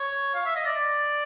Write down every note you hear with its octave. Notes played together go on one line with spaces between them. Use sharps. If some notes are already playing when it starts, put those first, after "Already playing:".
Already playing: C#5
F5
E5
D#5
D5